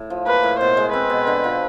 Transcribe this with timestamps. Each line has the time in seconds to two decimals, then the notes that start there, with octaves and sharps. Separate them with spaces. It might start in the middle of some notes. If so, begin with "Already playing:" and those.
Already playing: A2
0.10 F3
0.26 A#3 B4
0.43 A2
0.60 B2 C5
0.77 G#3
0.93 C4 B4
1.10 B2
1.27 D3
1.44 F3